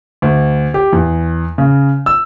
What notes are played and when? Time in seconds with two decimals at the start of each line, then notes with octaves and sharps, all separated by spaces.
0.22 D2
0.74 G4
0.93 E2
1.58 C#3
2.06 E6